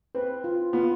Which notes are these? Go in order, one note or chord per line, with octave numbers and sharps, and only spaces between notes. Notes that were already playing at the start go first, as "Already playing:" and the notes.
C4 B4
F4
B3 F4